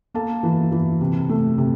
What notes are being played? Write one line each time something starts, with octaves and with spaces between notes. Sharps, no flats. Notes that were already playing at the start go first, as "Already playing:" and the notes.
A#3 A4 A5
E3
E3
C3
A3
C3